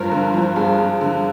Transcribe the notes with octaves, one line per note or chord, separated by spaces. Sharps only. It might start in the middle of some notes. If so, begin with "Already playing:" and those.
Already playing: G2 F3 A#4
D3
F3
G2 G#4
G2
D3